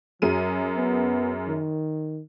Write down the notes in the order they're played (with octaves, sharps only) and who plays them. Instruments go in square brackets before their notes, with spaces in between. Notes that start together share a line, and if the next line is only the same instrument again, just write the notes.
[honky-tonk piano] F#2 G#4 D#7 [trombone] F#3
[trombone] B3
D#3